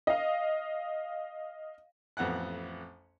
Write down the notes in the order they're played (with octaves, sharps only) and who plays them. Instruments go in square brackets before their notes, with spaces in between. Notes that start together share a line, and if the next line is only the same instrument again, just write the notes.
[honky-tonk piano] D#5 F5
[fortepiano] A1 F2 B3 F#5 F#6